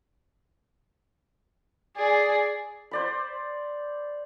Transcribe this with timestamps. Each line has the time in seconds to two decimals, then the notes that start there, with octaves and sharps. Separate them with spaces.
1.96 G#4 D5
2.91 C5 D5 B5